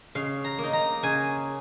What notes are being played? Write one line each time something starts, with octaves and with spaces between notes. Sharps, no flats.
C#3 F5
A#5
A#3
D#4
A#5
C#3 G#5